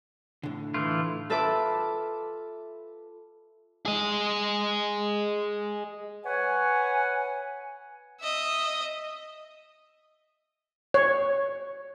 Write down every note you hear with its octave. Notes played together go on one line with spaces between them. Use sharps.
A2 D3
E3 A3 F4
F4 A4 B4 E5 A5 D6
G#4 D#5
B4 C#5 F#5 G#5
D#5 E5
C#5